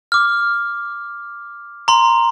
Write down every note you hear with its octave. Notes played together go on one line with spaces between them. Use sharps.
D6 F6
A#5 C6